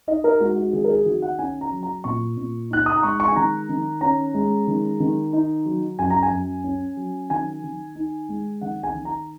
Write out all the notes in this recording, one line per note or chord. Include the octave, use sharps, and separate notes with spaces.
D#4 D#5
A#4
G#3 F#4
F#4
D#3 G#4
A#4
G#4
D#3 F#4
F#5
C#4 G#5
A#5
F#3
A#5
A#2 C#6
A#2
D#4 F#6
D#6
A#5
G#3 C#6
C#6
G#5
D#3 A#5
D#3
C#4 A#5
G#3
D#3
D#3
D#4
F#3
F#2 G#5
A#5
G#5
F#2
C#4
F#3
D#3 G#5
D#3
D#4
G#3
D#3 F#5
G#5
D#3
A#5